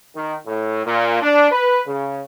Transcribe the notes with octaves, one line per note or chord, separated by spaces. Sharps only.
D#3
A2
A#2
D4
B4
C#3